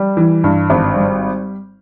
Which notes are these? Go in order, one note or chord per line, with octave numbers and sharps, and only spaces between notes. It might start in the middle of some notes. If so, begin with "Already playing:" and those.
Already playing: G3
E3
G2
G#1
G3